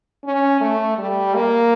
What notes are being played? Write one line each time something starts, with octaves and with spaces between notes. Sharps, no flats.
C#4
A3
G3
A#3